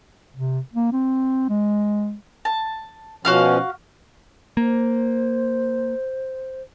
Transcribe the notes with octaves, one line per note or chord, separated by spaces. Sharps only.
C3
A#3
C4
G#3
A5
B2 F3 C#4 F#4 F5 F6
A#3 C5